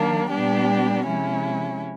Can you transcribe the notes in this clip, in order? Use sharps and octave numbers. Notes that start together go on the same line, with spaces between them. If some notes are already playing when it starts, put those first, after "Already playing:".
Already playing: D#3 F#3 A#3 D4
A#2 G3 B3 D4 G4
C3 F3 G#3 C#4 E4